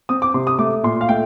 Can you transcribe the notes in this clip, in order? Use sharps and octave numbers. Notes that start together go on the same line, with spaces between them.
C4 D#6
D6
C3 C6
D#6
A3 D6
A#2 C6
F5
A3 G5